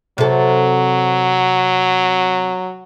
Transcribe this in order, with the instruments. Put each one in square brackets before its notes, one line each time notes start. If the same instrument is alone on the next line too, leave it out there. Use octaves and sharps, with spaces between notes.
[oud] C3 A4 [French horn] F#3